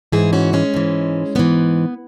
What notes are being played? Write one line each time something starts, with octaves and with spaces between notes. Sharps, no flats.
G#2 E3 E4 G#4
C#4 F#4
G#3 C#4
G#2 E3
G#2 E3 B3